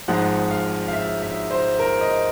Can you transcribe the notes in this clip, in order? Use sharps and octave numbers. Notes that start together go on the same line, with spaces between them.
G#1 G#2 F3 G#3 F#5
F5
F5
E5
E5
C5
A#4
D#5